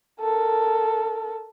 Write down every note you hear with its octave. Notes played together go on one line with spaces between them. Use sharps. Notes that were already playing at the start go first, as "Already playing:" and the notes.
A4 A#4